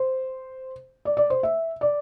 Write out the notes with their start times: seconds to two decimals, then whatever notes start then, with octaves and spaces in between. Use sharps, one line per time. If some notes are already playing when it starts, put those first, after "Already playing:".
Already playing: C5
1.05 D5
1.17 D5
1.30 C5
1.43 E5
1.81 D5